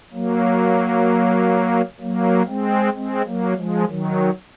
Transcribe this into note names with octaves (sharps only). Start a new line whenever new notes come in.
F#3 A#3
F#3 A#3
G#3 C4
G#3 C4
F#3 A#3
F3 G#3
D#3 F#3